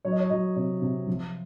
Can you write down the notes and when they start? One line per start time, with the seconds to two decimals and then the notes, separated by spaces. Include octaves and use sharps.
0.05 F#3 C#5
0.12 D#5
0.20 C#5
0.30 F#3 D#5
0.56 C3 C#5
0.82 C3
1.07 F3